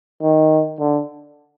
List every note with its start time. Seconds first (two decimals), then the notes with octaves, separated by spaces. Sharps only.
0.22 D#3
0.80 D3